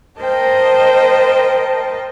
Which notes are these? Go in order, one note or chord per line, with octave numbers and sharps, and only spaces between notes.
A#4 C5 D#5 G5 A5